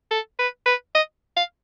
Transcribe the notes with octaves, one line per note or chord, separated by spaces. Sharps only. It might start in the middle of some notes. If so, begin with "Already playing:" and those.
A4
B4
B4
D#5
F5